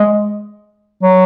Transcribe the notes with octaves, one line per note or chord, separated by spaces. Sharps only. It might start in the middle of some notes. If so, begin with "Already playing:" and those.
Already playing: G#3
F#3